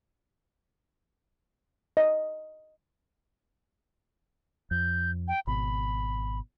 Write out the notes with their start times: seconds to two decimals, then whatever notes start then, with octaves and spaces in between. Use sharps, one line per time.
1.97 D#5
4.71 F2 G6
5.28 G5
5.47 G#1 B2 B5